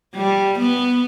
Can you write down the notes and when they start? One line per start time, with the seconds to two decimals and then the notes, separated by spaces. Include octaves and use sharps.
0.15 G3
0.59 B3